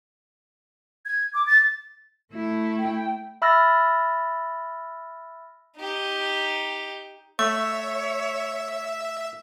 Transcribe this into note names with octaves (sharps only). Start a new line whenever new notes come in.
G#6
D6
A6
A3 E4
G5
E5 B5 E6 F6 A6 A#6
D#4 G4
A3 C#5 E5 C#6